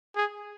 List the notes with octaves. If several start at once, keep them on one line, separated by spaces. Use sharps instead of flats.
G#4